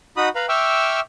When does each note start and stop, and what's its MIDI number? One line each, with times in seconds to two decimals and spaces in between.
0.17 0.29 63
0.17 0.29 66
0.17 0.29 83
0.17 0.29 87
0.35 0.46 71
0.35 0.46 77
0.35 0.46 82
0.35 0.46 83
0.49 1.00 76
0.49 1.00 79
0.49 1.00 85
0.49 1.00 86
0.49 1.00 88
0.49 1.00 89